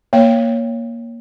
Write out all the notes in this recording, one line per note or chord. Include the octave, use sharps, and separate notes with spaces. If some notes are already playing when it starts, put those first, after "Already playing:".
A#3 C#5 G5